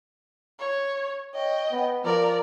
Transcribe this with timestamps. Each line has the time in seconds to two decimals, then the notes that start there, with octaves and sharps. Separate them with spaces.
0.60 C#5
1.34 C#5 D#5 G5
1.71 B3
2.04 F3 A#4 D5